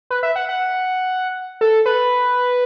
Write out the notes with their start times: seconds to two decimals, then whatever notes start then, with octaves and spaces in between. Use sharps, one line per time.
0.10 B4
0.23 E5
0.36 F#5
0.49 F#5
1.61 A4
1.86 B4